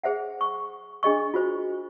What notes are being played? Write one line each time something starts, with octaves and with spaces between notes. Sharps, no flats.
G#4 C5 E5 F#5
C#6
D4 G#4 D#5 C#6
F4 F#4 C5